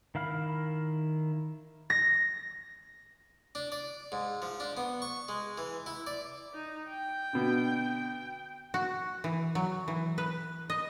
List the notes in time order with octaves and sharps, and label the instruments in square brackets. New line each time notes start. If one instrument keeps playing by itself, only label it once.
[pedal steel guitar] D#3 E4 F5 B5 F6
[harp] A#6
[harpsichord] D4
D5
G#2
F3
D4
B3
C#6
G#3
E3
E4
D5
[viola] D#4
G5
[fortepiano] B2 D3
[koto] F#4
E3
F#3
E3
B4
D#5